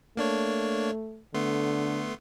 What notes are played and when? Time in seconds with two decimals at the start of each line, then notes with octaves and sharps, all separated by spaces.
0.17 A3 A#3 D4 C#5
1.34 D3 A3 B3 C6